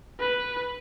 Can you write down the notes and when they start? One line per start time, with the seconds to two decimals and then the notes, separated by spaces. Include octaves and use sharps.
0.20 B4